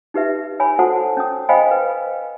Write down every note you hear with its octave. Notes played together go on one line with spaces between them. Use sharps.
D#4 G4 B4 E5
C#5 G#5 B5
F#4 A4 C5 F#5 A5
C#4 D#6
C5 D#5 F5 G5 G#5 B5
B4